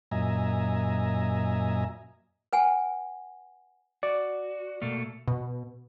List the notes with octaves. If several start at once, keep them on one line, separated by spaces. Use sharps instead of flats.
F#2 A#2 D#5 E5 G#5 A#5
B4 F#5 G#5
F#4 D5
B2 A3 A#3
B2